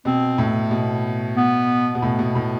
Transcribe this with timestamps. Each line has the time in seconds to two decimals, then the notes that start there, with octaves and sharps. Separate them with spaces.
0.05 B2 C4
0.38 A2
0.71 B2
1.37 B3
1.95 B2
2.02 A2
2.19 B2
2.35 A2